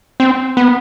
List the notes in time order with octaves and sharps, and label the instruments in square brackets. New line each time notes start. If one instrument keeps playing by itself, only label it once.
[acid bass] C4
B3